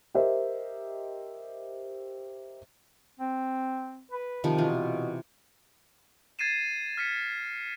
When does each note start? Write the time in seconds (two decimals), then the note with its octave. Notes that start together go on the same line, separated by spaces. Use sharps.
0.15 G4 A#4 C5 D#5 E5
3.20 C4
4.11 B4
4.44 C3 D#3 F3
4.58 B2 E3 F4
6.39 G#6 A6 C7 D#7 E7
6.97 F6 B6 C#7